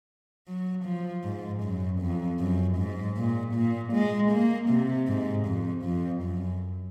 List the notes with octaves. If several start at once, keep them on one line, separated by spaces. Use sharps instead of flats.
F#3
F3
G#2
F#2
F2
F#2
G#2
A#2
A#2
G#3
A#3
C3
G#2
F2
F2
F#2